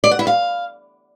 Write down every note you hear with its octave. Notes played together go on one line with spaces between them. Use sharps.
D5
F#5
E4
F5